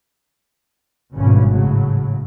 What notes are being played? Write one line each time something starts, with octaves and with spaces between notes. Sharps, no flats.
G#1 G2 B2 C#4
A2 C#3 F#3